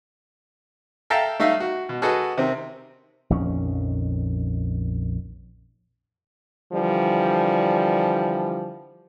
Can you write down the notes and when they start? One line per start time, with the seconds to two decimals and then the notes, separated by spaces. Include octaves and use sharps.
1.10 A4 E5 F5 G5 A5 A#5
1.40 A3 D#4 E5 F5
1.60 F#4
1.89 B2
2.02 F#4 G#4 A4 B4 D#5
2.38 C3 D#3 C4
3.30 A#1 F2 D#3 C#4
6.73 D3 E3 F3 G3